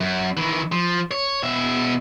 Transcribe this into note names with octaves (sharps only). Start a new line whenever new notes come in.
F#2
D#3 E3
F3
C#5
B2 E5